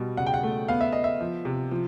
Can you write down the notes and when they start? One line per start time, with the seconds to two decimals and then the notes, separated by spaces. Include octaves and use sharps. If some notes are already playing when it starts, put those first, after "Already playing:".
Already playing: B2 G3
0.17 C#3 F#5
0.26 G5
0.34 F#5
0.43 A3
0.68 B3 F5
0.81 E5
0.92 B3 D#5
1.04 E5
1.21 F3
1.45 C3
1.71 F3